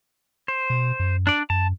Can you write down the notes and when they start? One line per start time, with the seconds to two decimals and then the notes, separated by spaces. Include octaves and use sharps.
0.48 C5
0.70 B2
1.00 F#2
1.27 D4 D5
1.50 F#2 A5